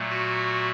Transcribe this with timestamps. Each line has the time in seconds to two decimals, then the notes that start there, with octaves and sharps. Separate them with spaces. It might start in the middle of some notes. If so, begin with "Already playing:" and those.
Already playing: A#2 F#3 A3
0.10 F#4